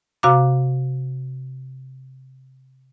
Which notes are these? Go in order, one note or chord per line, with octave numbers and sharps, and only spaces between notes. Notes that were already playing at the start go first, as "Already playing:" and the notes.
C3 F#4 F5 A#5 D6